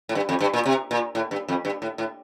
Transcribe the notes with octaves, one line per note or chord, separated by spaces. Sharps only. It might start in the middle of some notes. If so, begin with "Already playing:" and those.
A2
G2
F2
G2
A#2
C3
A#2
A2
G2
F2
G2
A2
A2